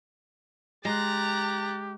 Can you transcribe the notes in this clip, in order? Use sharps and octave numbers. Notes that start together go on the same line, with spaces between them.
G#3 G4 A#5 F#6 A6